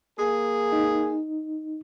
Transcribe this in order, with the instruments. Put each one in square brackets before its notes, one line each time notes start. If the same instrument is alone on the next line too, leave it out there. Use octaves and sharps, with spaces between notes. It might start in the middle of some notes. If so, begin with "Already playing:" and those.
[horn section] A#3 G#4
[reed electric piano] D#4